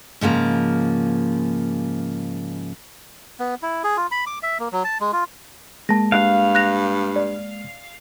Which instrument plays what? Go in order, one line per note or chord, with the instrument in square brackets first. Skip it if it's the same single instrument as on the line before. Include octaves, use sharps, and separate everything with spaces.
[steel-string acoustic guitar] G#2 C#3 F3 A#3
[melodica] B3
E4
G#4
F4
B5
D6
E5
A#3
F#3
A5
G#3
F4
[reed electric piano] G#3 A#3 [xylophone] A5 A#6
[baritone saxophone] G2 [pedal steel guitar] F5 [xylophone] F#6
[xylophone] F#6 A#6 F7
D5